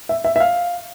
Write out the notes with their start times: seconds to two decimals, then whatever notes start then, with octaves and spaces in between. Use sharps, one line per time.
0.09 E5
0.24 E5
0.36 E5
0.40 F5